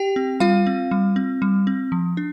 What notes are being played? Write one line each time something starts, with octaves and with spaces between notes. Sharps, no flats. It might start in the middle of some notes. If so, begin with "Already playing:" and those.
Already playing: G4 G5
C4
G3 F4 F5
C4
G3
C4
G3
C4
F3
D4